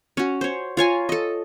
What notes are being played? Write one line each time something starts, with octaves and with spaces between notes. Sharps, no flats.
C#4 F#4
C5 C#5
F4 C#5 G#5 A#5
A4 D#5